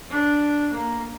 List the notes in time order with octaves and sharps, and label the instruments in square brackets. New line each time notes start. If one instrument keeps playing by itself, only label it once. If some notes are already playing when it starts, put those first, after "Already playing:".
[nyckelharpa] D4
A#3